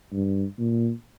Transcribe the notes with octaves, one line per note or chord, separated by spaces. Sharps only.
G2
A#2